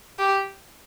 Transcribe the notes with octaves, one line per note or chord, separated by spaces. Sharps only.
G4